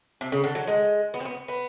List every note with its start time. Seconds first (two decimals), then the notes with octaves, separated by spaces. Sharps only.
0.21 C3
0.32 C#3
0.44 D3
0.55 F#3
0.67 G#3
1.14 B3
1.20 C4
1.25 B3
1.48 B3